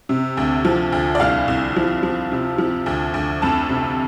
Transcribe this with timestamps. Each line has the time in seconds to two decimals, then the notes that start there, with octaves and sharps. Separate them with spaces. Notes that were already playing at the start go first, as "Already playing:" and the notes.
0.09 C3
0.37 D2
0.65 F3
0.92 D2
1.15 D5
1.20 C2 F5
1.48 C2
1.76 F3
2.03 F3
2.32 C3
2.58 F3
2.86 D2
3.14 D2
3.42 F2 A5
3.69 C3